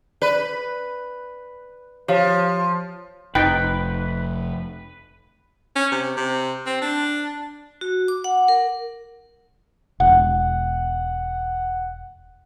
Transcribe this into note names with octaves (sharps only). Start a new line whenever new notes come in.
B4 D5
F3 G4 C#5 F5
F1 D#4 B4 G5
C#4
C3
C3
C4
D4
F#4
D6
F#5
A#4
E1 F#5